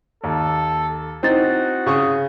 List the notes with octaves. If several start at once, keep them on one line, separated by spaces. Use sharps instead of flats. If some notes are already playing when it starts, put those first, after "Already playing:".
D#2 A4
C4 D#4 E4 F#4 A6
C#3 C#6 D#6